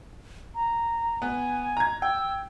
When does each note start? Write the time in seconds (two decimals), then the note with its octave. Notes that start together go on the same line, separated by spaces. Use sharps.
0.55 A#5
1.22 B3 G#5
1.77 A#5 G#6
2.02 G5 E6